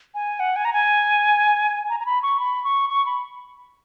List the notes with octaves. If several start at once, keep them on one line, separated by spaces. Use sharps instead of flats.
G#5
F#5
G#5
A#5
G#5
A#5
A#5
B5
C#6
B5
C#6
C#6
B5